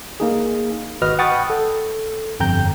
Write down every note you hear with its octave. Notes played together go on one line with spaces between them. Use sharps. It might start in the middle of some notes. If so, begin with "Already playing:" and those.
A#3 D#4 G#4
G#1 F#4 B4 D#5 F6
F#5 G5 B5 C#6 D#6 A6
A4
G1 F2 G5 A#5 G6